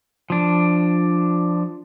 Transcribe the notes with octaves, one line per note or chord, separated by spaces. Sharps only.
F3 D4